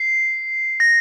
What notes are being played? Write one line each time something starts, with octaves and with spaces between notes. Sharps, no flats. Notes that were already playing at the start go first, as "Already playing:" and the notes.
Already playing: C7
A#6